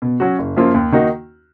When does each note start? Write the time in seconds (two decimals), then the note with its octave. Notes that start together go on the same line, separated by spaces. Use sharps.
0.02 B2
0.20 F#3 C#4 F#4
0.39 F#1
0.56 F#2 F3 A#3 F4
0.74 D#2
0.92 D#3 A#3 D#4 F#4